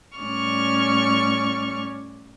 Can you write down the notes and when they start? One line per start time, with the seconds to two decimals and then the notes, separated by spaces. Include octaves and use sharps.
0.18 A2 G3 C#4 D5 C#6 F6